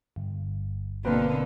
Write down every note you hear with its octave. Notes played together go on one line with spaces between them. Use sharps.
G1
B2 D3 A#3 C4 B4